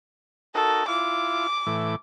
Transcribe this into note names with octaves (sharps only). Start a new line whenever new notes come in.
D#4 F#4 A4 A#4
E4 F4 D6
A2 E3